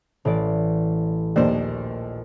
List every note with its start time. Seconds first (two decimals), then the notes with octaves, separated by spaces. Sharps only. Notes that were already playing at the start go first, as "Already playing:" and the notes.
0.25 A1 E3 D5
1.36 A#1 D#2 D4 C5 E7